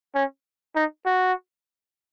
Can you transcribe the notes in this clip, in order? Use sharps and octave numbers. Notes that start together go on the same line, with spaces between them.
C#4
D#4
F#4